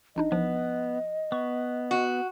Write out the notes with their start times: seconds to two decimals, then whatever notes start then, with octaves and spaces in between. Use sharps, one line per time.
0.16 A1 D4 D#4 D#5
0.32 A1 F3 B3
1.32 B3 C#6
1.91 F#4